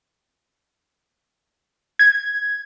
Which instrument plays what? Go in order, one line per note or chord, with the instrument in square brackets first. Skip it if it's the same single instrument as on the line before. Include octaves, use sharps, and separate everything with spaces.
[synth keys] G#6